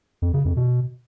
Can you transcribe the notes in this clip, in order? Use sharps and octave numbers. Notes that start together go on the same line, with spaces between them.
F2
C#3
F2
B2